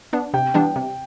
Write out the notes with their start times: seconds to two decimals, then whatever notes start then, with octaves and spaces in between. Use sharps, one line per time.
0.13 B3 D4
0.34 C3 G5
0.54 E3 G3 B3 D4
0.76 C3